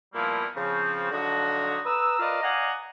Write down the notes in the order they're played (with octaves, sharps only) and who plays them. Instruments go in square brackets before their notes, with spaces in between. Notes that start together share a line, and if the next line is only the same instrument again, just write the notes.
[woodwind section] A#2 F3 G3 A#3 B3 E4
C#3 F3 C4
D3 F3 F#3 D#4 F#4
B4 A#5 D#6 E6
F4 A#4 B4 D5 D#5 F5
D5 D#5 F5 F#5 G#5 A#5